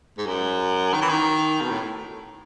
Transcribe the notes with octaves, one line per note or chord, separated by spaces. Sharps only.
G#2
F#2
D#3
E3
D#3
B2
A2